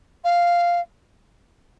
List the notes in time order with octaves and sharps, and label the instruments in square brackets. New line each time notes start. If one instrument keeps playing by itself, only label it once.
[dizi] F5